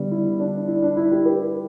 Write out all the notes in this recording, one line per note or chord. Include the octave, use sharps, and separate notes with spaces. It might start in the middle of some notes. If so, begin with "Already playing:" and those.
Already playing: D3 G3 B3
E4
D4
E4
D4
E4
E4 G4
G4 B4